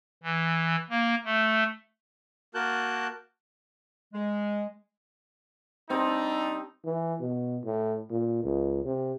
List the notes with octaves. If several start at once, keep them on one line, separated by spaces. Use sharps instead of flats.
E3
A#3
A3
A#3 F#4 A#4 A5 F#6 G6
G#3
G3 C4 D4 D#4
E3
B2
A2
A#2
C#2
C3